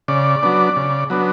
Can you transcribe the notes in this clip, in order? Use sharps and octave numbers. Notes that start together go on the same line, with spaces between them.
C#3 D5
F#3 B3 D4
C#3
F#3 B3 D4